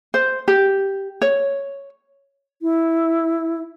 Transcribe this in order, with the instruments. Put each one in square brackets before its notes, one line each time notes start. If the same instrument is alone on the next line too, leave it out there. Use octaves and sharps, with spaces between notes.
[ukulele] C5
G4
C#5
[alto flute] E4